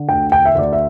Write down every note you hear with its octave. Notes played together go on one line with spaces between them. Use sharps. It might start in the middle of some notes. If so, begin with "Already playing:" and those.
Already playing: D3
D2 G5
G5
E5
D2 D5
E5